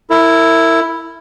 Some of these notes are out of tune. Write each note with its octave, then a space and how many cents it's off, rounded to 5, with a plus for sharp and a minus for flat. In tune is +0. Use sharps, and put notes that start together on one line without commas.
E4 +0 A#4 -35